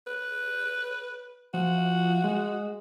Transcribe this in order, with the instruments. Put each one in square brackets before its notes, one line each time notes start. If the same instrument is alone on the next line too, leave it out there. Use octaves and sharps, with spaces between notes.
[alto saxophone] B4
[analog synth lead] F3 [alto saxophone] F#4
[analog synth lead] G#3